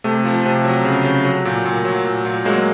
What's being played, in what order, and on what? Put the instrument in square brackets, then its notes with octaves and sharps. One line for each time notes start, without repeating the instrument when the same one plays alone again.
[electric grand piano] C3 A3
F3
C3
F#3
C#3
C#3
F#3
A#2
A#2
F#3
A#2
A#2
F#3 G#3 A#3